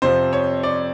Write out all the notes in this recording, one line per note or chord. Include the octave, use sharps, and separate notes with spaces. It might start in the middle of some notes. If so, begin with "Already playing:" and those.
F2 C3 F3 C5
C#5
D5